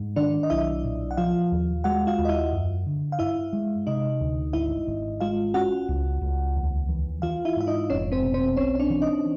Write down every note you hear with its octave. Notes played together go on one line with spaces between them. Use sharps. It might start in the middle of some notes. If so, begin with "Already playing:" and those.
Already playing: G#2
D#3 D4 D5
D#5
B1 E4 E5
A#2
F#5
F3 F4 F5
D#2
G#3 F#4 F#5
F4 F5
D#2
D#5
E4 E5
F#2
D3
F5
G2 E4 E5
G#3
C3 D#4 D#5
D2
G#1 E4 E5
G#1
G#3 F4 F5
C#4 F#4 F#5
C#2
C#2
D#2
E3
E3 F4 F5
E4 E5
G#2 E5
D#4 D#5
F1 C#4 C#5
C4 C5
B2
C4 C5
B1 C#4 C#5
C#5
D4 D5
E3
D#4 D#5